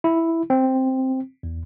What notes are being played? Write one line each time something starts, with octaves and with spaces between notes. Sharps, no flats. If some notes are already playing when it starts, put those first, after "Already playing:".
E4
C4
E2